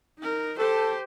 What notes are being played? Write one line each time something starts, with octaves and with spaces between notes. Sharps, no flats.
D#4 A#4
G4 A4 C5